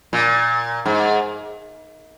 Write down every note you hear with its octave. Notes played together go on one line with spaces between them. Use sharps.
A#2
G#2